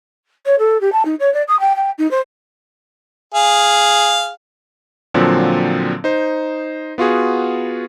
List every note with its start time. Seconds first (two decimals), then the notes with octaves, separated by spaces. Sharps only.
0.45 C#5
0.58 A4
0.80 G4
0.92 A5
1.05 D#4
1.19 C#5
1.33 D5
1.48 D#6
1.60 G5
1.76 G5
1.98 D#4
2.11 C5
3.35 G#4 F5
5.14 A#2 D3 F3 F#3 C4
6.04 D#4 C5
6.98 B3 F4 F#4 G#4